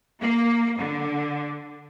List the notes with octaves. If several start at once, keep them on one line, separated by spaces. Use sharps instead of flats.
A#3
D3